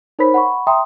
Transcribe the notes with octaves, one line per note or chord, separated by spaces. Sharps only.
D#4 A#4 C5 C#5 B5 B6
F#5 B5 C#6
E5 G5 A#5 C6 D#6